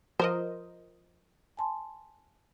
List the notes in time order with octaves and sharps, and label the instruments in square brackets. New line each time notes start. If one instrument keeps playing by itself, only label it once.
[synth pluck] F3 A#4 D#5 [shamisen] C5 [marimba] C6 F6
[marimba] G#5 A5 C6